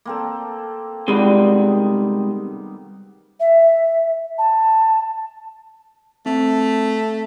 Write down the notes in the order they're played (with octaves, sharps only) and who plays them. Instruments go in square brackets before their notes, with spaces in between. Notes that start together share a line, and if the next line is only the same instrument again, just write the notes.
[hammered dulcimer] A#3 C4 A4
[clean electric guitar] C3 G#3 [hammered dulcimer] D#3 G3 B3
[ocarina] E5
A5
[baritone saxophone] A3 [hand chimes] C4